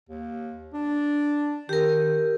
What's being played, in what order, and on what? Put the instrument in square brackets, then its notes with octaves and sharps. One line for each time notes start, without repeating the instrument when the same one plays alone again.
[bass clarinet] D#2
D4
[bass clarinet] D#3 [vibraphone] G4 A#4